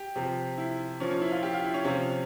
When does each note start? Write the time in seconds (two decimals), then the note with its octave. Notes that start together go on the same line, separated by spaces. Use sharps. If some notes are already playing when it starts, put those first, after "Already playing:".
Already playing: G4
0.16 C3 F3
0.58 E4
1.00 A#2 F3 C#4
1.10 C#4
1.21 E4
1.32 F4
1.43 G4
1.53 F4
1.64 E4
1.74 C#4
1.84 C3 F3 C#4